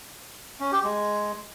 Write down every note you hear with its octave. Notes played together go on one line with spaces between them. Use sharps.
C#4
G4
G#3